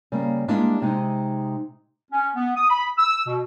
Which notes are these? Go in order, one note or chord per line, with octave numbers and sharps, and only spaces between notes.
C#3 G3 A#3
G3 G#3 A#3 D4 E4
C3 G#3 D#4
C#4
B3
D#6
B5
E6
B2